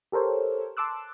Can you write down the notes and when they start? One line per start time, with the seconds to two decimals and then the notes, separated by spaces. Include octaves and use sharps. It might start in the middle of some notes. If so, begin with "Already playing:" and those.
0.12 G4 A4 A#4 C5 C#5
0.77 A5 C6 D6 E6 F#6